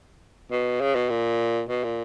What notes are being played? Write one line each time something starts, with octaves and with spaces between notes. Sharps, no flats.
B2
C#3
B2
A#2
B2
A#2